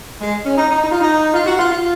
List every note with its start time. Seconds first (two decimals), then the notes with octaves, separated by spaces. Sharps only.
0.20 G#3
0.45 C#4
0.58 D#4
0.71 D#4
0.83 D#4
0.92 F4
1.01 D#4
1.34 F4
1.46 F#4
1.59 F4
1.70 F4